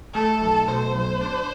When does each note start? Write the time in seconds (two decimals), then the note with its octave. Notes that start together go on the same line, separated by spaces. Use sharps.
0.15 A3 A4
0.42 B1
0.68 B2 C5
0.95 B1
1.21 D4